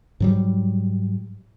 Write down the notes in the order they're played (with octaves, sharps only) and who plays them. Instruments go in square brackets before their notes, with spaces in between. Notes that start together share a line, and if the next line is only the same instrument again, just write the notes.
[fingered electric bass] G#2 F#3 G3